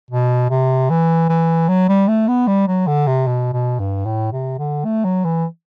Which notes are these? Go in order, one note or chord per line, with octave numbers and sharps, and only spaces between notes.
B2
C3
E3
E3
F#3
G3
A3
B3
G3
F#3
D3
C3
B2
B2
G2
A2
C3
D3
A3
F#3
E3